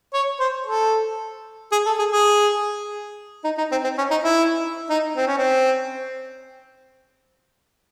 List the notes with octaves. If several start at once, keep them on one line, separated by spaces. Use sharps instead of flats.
C#5
C5
A4
G#4
A4
G#4
G#4
D#4
D#4
C4
C4
C#4
D#4
E4
D#4
C4
C#4
C4